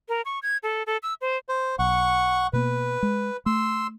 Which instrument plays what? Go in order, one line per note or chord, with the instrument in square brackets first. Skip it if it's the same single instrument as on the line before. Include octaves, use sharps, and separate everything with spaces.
[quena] A#4
C#6
G#6
A4
A4
E6
C5
[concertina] C5
[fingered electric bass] B1 [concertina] F#5 C#6
[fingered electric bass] B2 A#3 B3 [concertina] B4
[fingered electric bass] G#3
[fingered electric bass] A3 [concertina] C6 E6